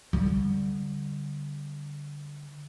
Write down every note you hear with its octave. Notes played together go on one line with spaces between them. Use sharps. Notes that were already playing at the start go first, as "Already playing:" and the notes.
D3 G3